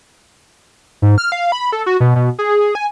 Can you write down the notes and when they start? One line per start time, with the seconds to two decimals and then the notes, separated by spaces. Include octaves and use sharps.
1.02 G#2
1.18 F6
1.32 F5
1.52 B5
1.72 A4
1.86 F#4
2.00 B2
2.16 B2
2.39 G#4
2.75 G#5